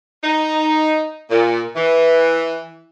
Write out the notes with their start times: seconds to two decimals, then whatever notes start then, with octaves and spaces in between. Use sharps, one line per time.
0.24 D#4
1.31 A#2
1.76 E3